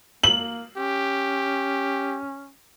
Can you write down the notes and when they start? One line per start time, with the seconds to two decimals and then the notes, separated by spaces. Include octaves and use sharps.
0.23 A#3 F#7
0.77 C#4 G4